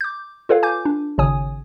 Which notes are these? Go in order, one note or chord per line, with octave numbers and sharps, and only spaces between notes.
D6 G6
F4 A4 B4 C#5 F5
G#5 D6 G6
D4
G#1 C#3 C#5 G#5 D#6